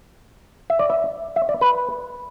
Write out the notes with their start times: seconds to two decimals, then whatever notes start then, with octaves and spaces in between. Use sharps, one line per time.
0.70 E5
0.79 D5
0.90 E5
1.36 E5
1.49 D5
1.61 B4